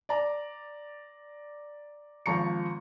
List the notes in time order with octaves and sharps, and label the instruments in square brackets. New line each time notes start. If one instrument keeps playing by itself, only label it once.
[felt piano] D5 A#5 D6
G#1 F3 A#5 C#6 C#7